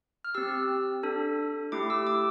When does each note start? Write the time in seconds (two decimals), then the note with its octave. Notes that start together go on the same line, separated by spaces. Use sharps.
0.24 F6
0.35 C4 G4 E6
1.03 D4 A4
1.72 A3 E4 G4 D6
1.90 E6
2.07 D6